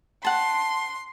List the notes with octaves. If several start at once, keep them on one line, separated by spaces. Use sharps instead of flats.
F#5 A5 C6